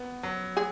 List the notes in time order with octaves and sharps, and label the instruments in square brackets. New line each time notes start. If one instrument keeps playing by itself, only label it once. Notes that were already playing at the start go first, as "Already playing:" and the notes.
Already playing: [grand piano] B3
F#3
[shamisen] G#4